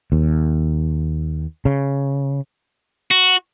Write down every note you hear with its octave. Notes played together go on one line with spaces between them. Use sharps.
D#2
C#3
F#4